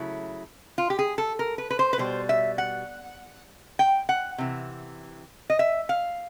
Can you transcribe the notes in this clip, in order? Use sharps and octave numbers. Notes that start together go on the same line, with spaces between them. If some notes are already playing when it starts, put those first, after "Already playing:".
Already playing: C#3 F#3 A3 E4
F4
G4
G#4
A4
A#4
B4
B4
C5
B4
B2 G3 C5
E5
F#5
G5
F#5
C3 E3
D#5
E5
F5